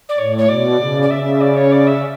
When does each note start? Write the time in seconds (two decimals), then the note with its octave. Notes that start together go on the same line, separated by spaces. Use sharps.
0.09 D5
0.18 A2 C#5
0.37 C#5
0.48 B2 D5
0.79 C#3
1.02 D5
1.10 C#3 E5
1.40 D5
1.55 C#5
1.71 D5
1.87 E5